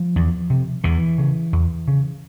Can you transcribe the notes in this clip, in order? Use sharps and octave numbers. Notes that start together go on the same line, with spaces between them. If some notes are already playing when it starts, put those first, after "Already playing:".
Already playing: F3
E2
C3
E2 E3
C#3
E2
C#3